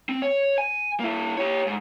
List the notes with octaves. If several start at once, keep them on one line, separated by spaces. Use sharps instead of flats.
C4
C#5
G#5
A#3 E4
G4 C#5
G#2